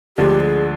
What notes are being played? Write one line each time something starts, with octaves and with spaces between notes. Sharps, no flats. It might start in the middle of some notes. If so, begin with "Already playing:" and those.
D2 D3 F3 G#3 D4 G4
G#4